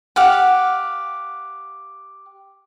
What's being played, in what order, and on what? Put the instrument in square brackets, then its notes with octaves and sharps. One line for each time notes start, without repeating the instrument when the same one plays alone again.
[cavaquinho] G4 F5 F#5